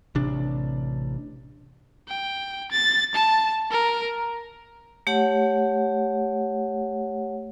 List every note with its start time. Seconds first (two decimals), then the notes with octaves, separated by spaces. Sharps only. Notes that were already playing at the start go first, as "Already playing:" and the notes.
0.15 A1 C3 D4
2.08 G5
2.71 A6
3.14 A5
3.71 A#4
5.07 A3 G4 C#5 F#5